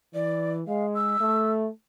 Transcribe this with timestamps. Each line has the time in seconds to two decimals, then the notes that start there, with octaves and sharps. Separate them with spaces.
0.14 E3 D5
0.68 G#3 F5
0.95 E6
1.21 A3